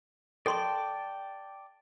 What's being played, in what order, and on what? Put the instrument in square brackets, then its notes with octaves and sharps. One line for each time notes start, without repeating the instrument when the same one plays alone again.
[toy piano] A4 C6 C#6 [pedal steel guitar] D5 G5 A5